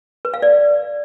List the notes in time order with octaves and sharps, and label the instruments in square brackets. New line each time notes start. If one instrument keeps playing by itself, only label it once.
[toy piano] B4
F5
D5